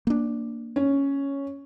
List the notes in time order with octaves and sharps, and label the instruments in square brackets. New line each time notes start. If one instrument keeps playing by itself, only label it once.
[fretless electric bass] A#3 D4
[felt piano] C#4